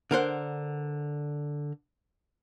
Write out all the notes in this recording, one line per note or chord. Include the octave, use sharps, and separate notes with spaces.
D3 A#4 C5 F#5